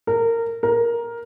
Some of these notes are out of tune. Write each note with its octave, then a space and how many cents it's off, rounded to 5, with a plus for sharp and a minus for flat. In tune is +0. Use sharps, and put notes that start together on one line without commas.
A#4 -20
A#4 +10